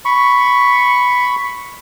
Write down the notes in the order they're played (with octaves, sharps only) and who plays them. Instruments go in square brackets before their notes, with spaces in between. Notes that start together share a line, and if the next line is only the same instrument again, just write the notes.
[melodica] B5 C#6